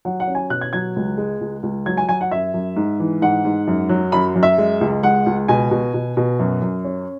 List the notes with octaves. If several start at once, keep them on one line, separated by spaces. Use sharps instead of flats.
F#3 F#5
F#5
C#4
G#5
B2 F#6
G#6
F#3 G#6
C#2
G#3
C#2
C#2
F#3 G#6
G#5
F#3 G#5
F#5
F#2 E5
F#2
G#2
E3
G#2 F#5
G#2
F#2
F#3
F#2 B5
F#2
E5
G#3
C#2
G#3 F#5
C#2
B2 G#5
B2
B2
B2
F#2
F#2
C#4